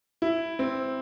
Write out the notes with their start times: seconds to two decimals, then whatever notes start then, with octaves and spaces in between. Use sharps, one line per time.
0.22 E4
0.59 C4